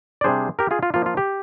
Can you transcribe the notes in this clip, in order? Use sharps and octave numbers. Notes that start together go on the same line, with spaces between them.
D5
C3 G3 D4 G#4 C5
G4 A#4
F4 G#4
F4
F3 A#3 F4
F4
G4